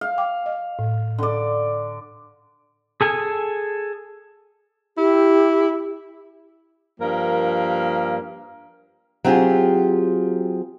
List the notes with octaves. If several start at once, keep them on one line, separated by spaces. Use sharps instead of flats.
F5
G5 D6
D#5
A2
D3 D5
G#4 A4 G#5
E4 G4
G2 F3 A#3 A#4 F5
F#3 C4 F4 G4 G#4